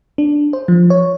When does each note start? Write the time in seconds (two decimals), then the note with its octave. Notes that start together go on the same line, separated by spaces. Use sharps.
0.18 D4
0.53 C5
0.68 F3
0.90 C#5